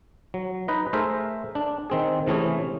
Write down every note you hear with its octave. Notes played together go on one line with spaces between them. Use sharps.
F#3
D#4 B4 D#5
A3 G#4 A#4 C5 E5
D4
D#3 C4 G#4
C3 E3 A3 C#4 G#4